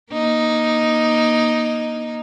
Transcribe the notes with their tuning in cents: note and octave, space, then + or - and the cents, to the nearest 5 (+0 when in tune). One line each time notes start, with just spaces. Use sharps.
A#3 +25 D#4 +0